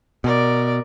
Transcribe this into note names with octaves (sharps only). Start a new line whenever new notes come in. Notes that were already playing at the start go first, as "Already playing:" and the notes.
B2 A#4 D5